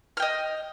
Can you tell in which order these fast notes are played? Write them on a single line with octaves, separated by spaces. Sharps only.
F6 G5 D#5